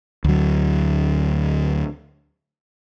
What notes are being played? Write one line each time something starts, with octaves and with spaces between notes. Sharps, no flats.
D2 F#3